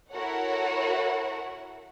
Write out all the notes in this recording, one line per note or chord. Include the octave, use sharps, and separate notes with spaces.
E4 F#4 A4 A#4 C#5 F#5